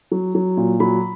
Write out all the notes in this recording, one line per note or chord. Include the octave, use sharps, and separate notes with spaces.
F#3
F#3
A#2
F#3 B5